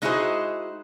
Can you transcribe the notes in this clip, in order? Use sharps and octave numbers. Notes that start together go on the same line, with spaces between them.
G#3 D#4 E4 F#4 G#4 C5